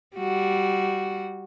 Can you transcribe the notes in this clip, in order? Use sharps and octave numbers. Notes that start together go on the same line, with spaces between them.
G3 F#4